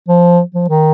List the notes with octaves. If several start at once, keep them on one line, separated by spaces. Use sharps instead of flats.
F3
F3
D#3